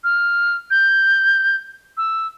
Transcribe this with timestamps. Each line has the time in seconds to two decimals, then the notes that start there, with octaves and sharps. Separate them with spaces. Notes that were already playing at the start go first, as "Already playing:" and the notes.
0.04 F6
0.71 G6
1.97 E6